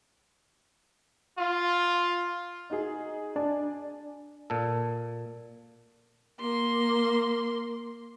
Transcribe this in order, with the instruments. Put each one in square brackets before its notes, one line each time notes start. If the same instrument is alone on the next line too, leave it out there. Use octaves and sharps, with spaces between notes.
[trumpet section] F4
[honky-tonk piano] D#4 F#4 G#4
[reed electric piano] D4 [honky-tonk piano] D5 G#5
[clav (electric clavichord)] A#2 A4
[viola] A#3 C6